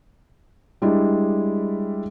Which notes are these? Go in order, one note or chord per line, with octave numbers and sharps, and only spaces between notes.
G3 G#3 D4 E4